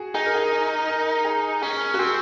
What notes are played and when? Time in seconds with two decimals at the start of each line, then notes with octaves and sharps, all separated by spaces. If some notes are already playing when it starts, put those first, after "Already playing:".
Already playing: F#4 G#4
0.14 D#4 G#4
0.25 A#4
0.34 G#4
0.88 A#4
1.24 G#4
1.61 C#4 G#4
1.94 F#4
1.99 C4 G#4